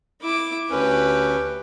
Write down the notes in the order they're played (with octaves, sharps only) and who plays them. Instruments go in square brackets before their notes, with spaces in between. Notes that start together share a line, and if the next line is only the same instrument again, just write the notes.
[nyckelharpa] E4 D6
[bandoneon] D2 C#4 [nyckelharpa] G4 B4